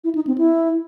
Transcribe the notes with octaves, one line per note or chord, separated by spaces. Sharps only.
E4
D#4
C4
E4